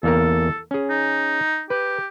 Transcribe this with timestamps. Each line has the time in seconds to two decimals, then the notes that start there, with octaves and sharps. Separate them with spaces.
0.03 E2 A#3 A4 A#4
0.71 C#4 G#4
0.90 D#4
1.70 G4 B4